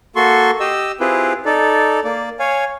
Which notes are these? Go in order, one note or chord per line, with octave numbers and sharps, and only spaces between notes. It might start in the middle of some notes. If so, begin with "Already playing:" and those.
A#3 F#4 A4 C6 C#6
G4 D#5 E6
C4 E4 F4 G4 G#4 B4
D#4 A4 D5
A#3 D5
C#5 F5 G#5